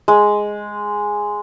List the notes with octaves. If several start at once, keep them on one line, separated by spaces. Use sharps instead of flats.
G#3